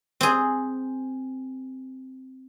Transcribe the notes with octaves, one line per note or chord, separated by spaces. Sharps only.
C4 G#4